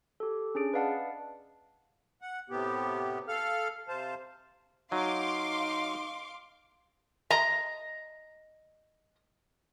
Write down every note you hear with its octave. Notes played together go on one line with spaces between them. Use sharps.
G4 A4
C#4 D4 G#4 D7
B4 D5 D#5 F5 F#5 A5
F#5
A2 C3 B3 G4
A4 F5 F6
C3 C5 F5 A5
F#3 D#4 F5 C6 D6
D#5 A#5